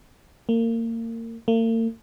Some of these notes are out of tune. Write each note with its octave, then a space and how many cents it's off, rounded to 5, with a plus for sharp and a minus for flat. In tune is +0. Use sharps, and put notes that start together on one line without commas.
A#3 -30
A#3 -45